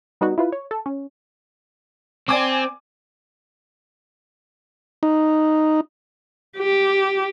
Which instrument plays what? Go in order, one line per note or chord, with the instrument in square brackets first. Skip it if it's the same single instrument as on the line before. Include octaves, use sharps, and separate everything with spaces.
[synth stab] G3 B3 D#4 F#4
E4 F4 B4
C#5
A4
C#4
[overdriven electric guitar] C4 [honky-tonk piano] D5 G#5 D6
[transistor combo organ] D#4
[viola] G4